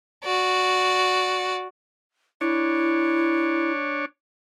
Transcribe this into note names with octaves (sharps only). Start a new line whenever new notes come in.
F#4 D5
D4 E4 C#5